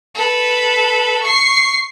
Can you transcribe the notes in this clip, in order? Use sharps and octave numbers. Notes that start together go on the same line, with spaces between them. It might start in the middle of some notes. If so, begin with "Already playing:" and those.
A4 B4
C#6 C7